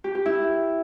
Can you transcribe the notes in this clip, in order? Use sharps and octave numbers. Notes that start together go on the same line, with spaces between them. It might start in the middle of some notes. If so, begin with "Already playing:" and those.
G4
G4
E4